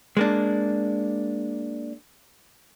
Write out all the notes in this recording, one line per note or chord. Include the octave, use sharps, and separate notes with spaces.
G#3 A#3 D4